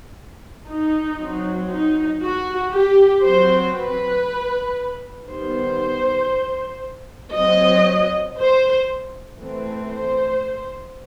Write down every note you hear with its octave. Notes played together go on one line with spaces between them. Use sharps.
D#4
F#3 C4
D#4
F#4
G4
F#3 C4 C5
B4
D#3 G3 B3 C5
F#3 C4 D#5
C5
E3 A3 C4
C5